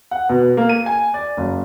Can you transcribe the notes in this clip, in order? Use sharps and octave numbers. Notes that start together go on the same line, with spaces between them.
F#5
B2
A#3
D#7
G#5
D5
F#1